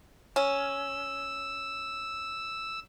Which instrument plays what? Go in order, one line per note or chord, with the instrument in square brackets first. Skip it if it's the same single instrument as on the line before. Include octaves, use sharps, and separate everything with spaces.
[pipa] C#4 [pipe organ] E6